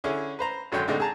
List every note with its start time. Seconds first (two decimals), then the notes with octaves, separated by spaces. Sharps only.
0.04 D3 C#4 E4 G#4
0.39 B4 C5 A#5
0.72 G#1 F#2 D3 C#5 G5 C6
0.88 A2 D3 G#3 C4 D4 D#4
1.00 G#4 A5 A#5